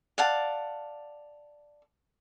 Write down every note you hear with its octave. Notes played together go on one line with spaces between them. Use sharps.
D5 F5 F#5 A5